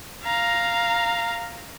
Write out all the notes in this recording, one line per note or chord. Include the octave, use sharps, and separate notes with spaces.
F5 A#5